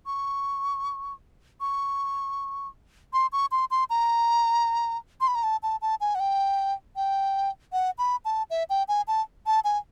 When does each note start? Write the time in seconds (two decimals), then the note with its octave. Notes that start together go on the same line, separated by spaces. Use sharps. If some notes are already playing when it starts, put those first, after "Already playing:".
0.06 C#6
1.60 C#6
3.13 C6
3.32 C#6
3.52 C6
3.71 C6
3.90 A#5
5.21 C6
5.28 B5
5.35 A#5
5.43 A5
5.63 A5
5.82 A5
6.01 G#5
6.15 F#5
6.20 G5
6.96 G5
7.73 F#5
7.98 B5
8.25 A5
8.50 E5
8.70 G5
8.88 G#5
9.07 A5
9.46 A5
9.64 G#5